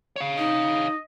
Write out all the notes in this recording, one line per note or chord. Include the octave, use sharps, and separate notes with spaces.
C#5 F5
D#4 D#5